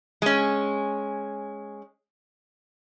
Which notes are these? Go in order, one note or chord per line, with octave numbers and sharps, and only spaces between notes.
G#3 C#4